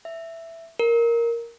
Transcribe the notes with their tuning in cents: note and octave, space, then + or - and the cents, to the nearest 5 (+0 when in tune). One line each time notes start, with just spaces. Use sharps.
E5 +5
A#4 +0